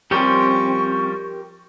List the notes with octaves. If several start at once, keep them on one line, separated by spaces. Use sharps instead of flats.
F3 G3 C4 C#4 G4 A#4 C6 C#6